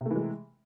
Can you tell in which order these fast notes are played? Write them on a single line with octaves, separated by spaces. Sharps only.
C3 A3 E3 G#3